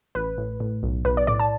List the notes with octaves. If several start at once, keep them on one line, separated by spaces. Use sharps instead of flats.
A1 B4
A2
A2
B1
B1 B4
D5
A2 D5
A5